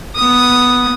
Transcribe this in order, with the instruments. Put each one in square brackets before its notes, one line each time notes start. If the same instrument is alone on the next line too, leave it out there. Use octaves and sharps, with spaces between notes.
[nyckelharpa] B3 D#6